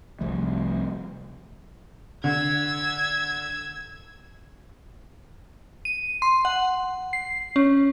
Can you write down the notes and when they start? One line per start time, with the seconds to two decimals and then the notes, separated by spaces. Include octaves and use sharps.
0.21 C2 F3 A3
2.24 D3 E6 G#6
5.85 D#7
6.22 C6
6.45 F#5
7.13 C7
7.56 C#4